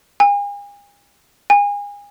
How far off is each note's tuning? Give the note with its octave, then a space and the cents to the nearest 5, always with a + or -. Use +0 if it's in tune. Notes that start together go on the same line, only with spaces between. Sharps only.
G#5 -40
G#5 -30